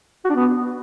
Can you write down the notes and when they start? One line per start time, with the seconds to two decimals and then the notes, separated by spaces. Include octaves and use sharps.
0.25 F#4
0.30 D4
0.35 B3